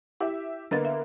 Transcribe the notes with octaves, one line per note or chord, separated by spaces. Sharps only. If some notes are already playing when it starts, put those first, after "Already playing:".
E4 G4 E5
D3 A#3 B3 A#4 D#5 A6
E5